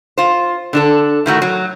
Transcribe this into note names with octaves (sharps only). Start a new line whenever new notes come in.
F4 C5
D3 D4 A4
A2 D#3 A3 F#4
F#3